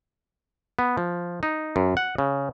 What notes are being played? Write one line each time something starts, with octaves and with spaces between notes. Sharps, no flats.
B3
F3
D#4
F#2
F#5
C#3